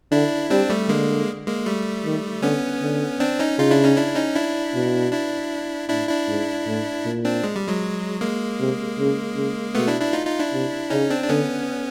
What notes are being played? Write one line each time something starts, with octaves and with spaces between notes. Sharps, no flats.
D3 D4 E4
G3 C4 D4
G3 A3
D3 G#3 A#3
G#3 A#3
G3 A3
D#3
D3 B3 C#4
D3
C4 D4
C#4 D#4
C#3 D#4 F4
D4 E4
C#4 D#4
D4 E4
C#4 D#4
D4 E4
B2
D4 E4
A2 D4 E4
D4 E4
G#2
A2
A#2
C4 D4
G#3
G3
F#3 G#3
G#3 A#3
C3
C#3
C#3
B2 A3 B3
D4 E4
D4 E4
D#4 F4
D#4 F4
D4 E4
C3
C#3 C#4 D#4
C4 D4
D4
D3 B3 C#4